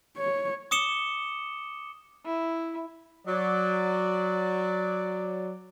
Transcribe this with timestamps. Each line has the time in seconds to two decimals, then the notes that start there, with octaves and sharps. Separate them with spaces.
0.18 C#5
0.71 D6 D#6 C#7 E7 G7
2.25 E4
3.27 F#3 D5